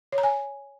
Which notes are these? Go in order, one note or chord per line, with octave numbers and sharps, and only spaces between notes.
C#5
A#5
G#5